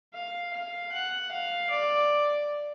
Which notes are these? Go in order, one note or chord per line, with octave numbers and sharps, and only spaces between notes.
F5
F5
F#5
F5
D5